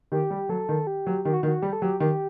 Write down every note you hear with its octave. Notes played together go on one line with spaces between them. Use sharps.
D#3 G4
G3
F#3 A4
D#3
G4
F#3
D#3 G4
F#4
D#3
F#4
G3 G4
A4
F#3 G4
D#3 G4